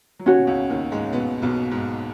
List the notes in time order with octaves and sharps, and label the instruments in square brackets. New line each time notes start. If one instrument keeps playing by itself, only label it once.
[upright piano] F#3
[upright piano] D#2 D#3 [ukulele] C#4 F#4 C#5
[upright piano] B2
C#2 C#3
D#2 D#3
G#2 G#3
B2 B3
B1 B2
G#2